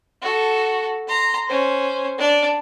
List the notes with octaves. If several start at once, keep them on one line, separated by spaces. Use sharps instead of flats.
F#4 A4
A#5 C6
C#4 C5
D4 D5